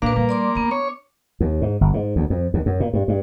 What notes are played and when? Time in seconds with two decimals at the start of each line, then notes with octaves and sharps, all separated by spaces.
0.02 A#2 A#3 D4 B4 F5
0.16 G3 A#3
0.29 D5 C6 D6
0.56 B3 D4 A#5
0.71 C#5 D6
1.40 D#2
1.62 G#2
1.81 G1
1.94 G#2
2.16 D2
2.30 F2
2.54 D#2
2.66 F#2
2.80 A#2
2.93 G2
3.08 G2